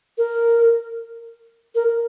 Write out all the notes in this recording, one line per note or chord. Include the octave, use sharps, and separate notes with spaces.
A#4
A#4